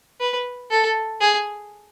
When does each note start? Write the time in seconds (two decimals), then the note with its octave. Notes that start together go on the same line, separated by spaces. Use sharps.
0.20 B4
0.71 A4
1.21 G#4